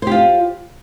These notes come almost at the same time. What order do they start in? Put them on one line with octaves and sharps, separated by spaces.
C5 G4 F4